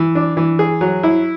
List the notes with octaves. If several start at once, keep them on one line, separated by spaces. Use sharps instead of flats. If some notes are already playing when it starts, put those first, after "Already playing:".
Already playing: E3
D4
E3
G#4
F#3
E4